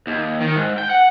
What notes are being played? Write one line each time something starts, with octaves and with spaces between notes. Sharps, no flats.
D#2
D#3
G#2
G5
F#5